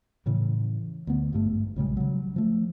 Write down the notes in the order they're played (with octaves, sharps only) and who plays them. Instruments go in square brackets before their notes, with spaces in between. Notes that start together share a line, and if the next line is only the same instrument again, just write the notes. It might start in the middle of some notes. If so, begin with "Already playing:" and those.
[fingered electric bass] A2 C#3 E3
D2 B3
G#1 G2 A3
A#1 C#3 G3 G#3
C#3 F#3
F3 A3